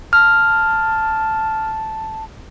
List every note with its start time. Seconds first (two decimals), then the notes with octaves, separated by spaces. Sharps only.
0.13 A5 F6